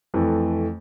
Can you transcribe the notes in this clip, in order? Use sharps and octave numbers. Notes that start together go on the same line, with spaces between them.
F2 E3 A3